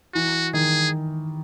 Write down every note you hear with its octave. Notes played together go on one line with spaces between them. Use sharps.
E3 F#4
D#3 G#4